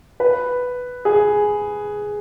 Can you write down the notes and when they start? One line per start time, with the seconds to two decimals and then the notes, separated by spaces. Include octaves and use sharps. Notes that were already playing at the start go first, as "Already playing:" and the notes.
0.20 B4
1.05 G#4